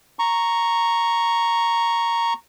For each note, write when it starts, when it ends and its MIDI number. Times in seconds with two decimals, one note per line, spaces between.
0.19 2.34 82
0.19 2.34 85